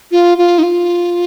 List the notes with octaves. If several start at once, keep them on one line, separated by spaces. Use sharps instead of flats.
F4
F4
D#4
F4